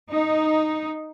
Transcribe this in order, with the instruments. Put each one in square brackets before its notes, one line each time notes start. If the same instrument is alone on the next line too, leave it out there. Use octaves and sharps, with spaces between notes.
[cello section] D#4